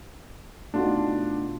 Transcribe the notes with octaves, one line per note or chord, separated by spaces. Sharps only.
B2 A3 D4 D#4 F4 F#4